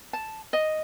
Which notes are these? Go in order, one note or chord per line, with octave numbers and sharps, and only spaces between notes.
A5
D#5